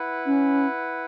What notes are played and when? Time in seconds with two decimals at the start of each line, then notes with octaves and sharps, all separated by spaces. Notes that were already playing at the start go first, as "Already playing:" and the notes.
Already playing: E4 B4 F#5
0.26 C#4